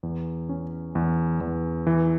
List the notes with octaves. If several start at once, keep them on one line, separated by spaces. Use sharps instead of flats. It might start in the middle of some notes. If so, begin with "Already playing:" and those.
E2
C#4
E2
E2
E3